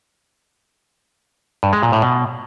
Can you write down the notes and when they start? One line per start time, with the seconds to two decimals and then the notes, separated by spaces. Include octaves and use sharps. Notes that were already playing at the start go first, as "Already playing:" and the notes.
1.63 G2
1.73 G#3
1.83 A#2
1.92 A2
2.02 B2